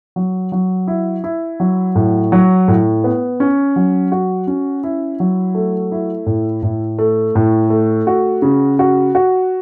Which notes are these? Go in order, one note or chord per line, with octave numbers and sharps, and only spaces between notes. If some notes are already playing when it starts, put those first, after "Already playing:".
F#3
F#3
E4
E4
F#3
A2
F#3
A2
B3
C#4
F#3
F#4
C#4
E4
F#3
A3
E4
A2
A2
A3
A2
A3
F#4
C#3
F#4
F#4